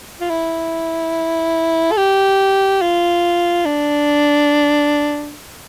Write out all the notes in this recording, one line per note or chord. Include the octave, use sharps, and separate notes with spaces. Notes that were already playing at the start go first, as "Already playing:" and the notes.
F4
E4
A4
G4
F4
D4